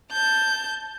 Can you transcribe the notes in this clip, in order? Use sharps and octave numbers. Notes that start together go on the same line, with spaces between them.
A5 G6